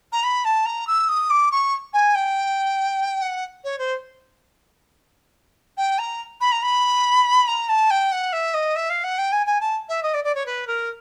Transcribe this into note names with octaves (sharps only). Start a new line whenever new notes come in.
A#5
B5
A5
A#5
E6
D#6
D6
C#6
G#5
G5
F#5
C#5
C5
G5
A#5
B5
A#5
B5
A#5
A5
G5
F#5
E5
D#5
E5
F5
F#5
G5
G#5
G#5
A5
E5
D#5
D5
D5
C#5
B4
A#4